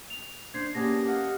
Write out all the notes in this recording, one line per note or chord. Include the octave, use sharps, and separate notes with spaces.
F7
D4 C5 G#6 C7
A#3 B3 C#4 D4 G4 G#4 A#6
D#5 F5 F#5